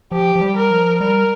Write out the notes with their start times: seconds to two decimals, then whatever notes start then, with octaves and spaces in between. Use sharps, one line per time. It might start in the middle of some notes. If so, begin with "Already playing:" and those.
0.12 F3 G4
0.36 F3
0.41 G3
0.56 A#4
0.71 F3
1.00 G3 A#4